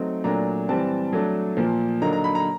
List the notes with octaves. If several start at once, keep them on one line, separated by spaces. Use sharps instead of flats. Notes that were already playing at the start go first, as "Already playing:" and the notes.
Already playing: F#3 A3 C4 D#4
A#2 F#3 A3 D4 A#5
E3 G3 C4 A5
F#3 A3 D4
A#2 F3 A#3
D3 F#3 A#3 D#4 A#5
A#5
B5
A#5